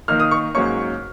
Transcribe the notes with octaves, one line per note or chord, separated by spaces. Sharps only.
D#3 A#3 D#4 F6
D#6
C#6
G#2 F#3 A#3 C#4 C#6